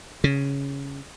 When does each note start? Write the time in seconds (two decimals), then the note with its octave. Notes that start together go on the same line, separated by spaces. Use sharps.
0.24 C#3